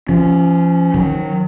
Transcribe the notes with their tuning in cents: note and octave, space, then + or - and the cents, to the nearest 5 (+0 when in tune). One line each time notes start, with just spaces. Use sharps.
F3 -30 C#4 +0
D#3 +0 F#3 -15